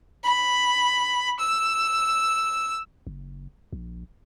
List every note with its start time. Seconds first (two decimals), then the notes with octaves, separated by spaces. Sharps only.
0.24 B5
1.40 E6
3.07 F#1
3.73 A#1